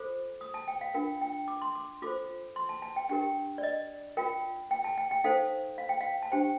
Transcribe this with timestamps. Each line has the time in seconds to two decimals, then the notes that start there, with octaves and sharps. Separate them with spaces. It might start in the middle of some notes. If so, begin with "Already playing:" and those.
Already playing: F4 A4 C5 D6
0.41 D#6
0.54 A5
0.68 G5
0.81 F5
0.94 D4 F4 A#4 G5
1.21 G5
1.48 D6
1.62 C6
1.75 D6
2.02 F4 A4 C5 D6
2.56 C6
2.69 A5
2.82 A5
2.96 G5
3.09 D4 G4 A#4 G5
3.58 D5
3.63 D#5
4.17 F4 A#4 G5
4.71 G5
4.84 A5
4.98 G5
5.11 G5
5.24 D#4 A4 C5 F5
5.78 F5
5.89 G5
6.01 F5
6.23 A5
6.32 D4 G4 C5 G5